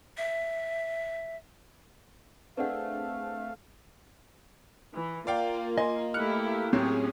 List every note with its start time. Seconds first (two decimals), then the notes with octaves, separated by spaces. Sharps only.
0.18 E5
2.57 A3 C4 D4 G#4 B4 D5 F5 F#5
4.93 E3
5.27 A#3 F4 D5 F5 G5
5.78 D#5 G#5 C6
6.14 A3 E4 G4 F6 F#6 C#7
6.73 A2 F#3 C4 C#4 G4 G#4